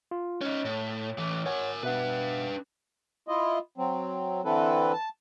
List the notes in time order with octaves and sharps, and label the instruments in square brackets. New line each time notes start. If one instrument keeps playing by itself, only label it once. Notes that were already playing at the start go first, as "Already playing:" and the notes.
[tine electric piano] F4
[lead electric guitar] C#4 D#4 [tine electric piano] C#5
[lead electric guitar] A2
A2 E3
[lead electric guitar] A#4 G#5 [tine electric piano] C#5 F#5
[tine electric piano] B2 E5 F#5 [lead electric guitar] D4 B4
[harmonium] E4 F4 D#5
F#3 C4
D3 E3 C4 E4 A4 B4
A5